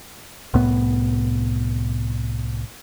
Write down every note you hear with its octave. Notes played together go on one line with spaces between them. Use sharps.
C2 A2 B3